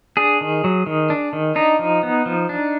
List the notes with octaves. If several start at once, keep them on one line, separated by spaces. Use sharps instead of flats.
D4 G#4
D#3
F#3
D#3
D4
D#3
D4 D#4
F3
B3
F3
D4